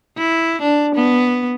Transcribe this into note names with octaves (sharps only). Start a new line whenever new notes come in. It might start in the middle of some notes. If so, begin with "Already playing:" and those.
E4
D4
B3